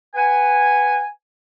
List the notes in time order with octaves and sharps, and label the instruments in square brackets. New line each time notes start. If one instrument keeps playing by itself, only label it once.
[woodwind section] B4 F#5 G#5